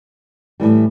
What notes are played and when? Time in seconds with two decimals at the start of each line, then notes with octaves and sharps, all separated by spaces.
0.60 A2 E3 G3